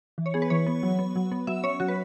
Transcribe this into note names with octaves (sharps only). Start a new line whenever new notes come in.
E3
C#5
B3 G#4
B4
E3 C#5
B3
F#3
B3
F#3
B3
F#3 E5
C#4 C#5
F#3 F#4
B4